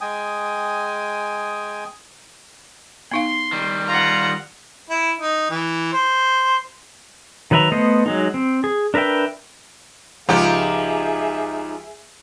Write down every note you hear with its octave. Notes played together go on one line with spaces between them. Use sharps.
G#3 G5 G#5 D#6
B3 D#4 F5 C6
D#3 G3
F4 F#5 A#5
E4
D#4
E3
C5
D#3 F#3 B4 E5 A#5
A3 B3 C5 D#5
F#3 G#3 D#4
C4
G#4
D4 A#4 B4 E5 G5
C#2 F3 D#4 G4 G#4 E5